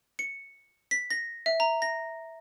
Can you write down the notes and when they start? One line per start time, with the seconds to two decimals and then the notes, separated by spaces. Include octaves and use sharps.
0.19 C#7
0.91 B6
1.11 A#6
1.46 E5
1.60 A#5
1.82 A#6